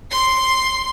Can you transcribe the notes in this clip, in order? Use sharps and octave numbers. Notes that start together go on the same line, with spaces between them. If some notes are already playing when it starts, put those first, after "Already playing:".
C6 C7